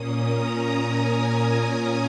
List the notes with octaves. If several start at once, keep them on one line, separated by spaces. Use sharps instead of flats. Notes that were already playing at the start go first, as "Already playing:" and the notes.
Already playing: A#2 A#3 C#4 D#6
A#5
G#5